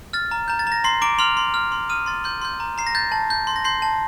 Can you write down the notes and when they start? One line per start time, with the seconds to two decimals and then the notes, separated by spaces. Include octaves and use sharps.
0.13 F6 A6
0.31 A#5
0.48 A#5 G6
0.59 A6
0.67 A#5 A#6
0.84 A#5 C6 C7
1.02 A#5 D6 D7
1.19 C6 F6 F7
1.37 C6
1.54 F6
1.72 C6
1.89 D#6 F6 D#7
2.06 C6 A6
2.24 C6 G6
2.41 C6 G6
2.60 A#5
2.78 A#5 C7
2.87 A#6
2.95 G6 A6
3.12 A5
3.30 G6
3.47 C6
3.56 A#6
3.64 C6 G6 C7
3.82 A5